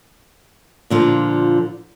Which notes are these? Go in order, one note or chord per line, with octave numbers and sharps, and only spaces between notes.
A#2 D3 F3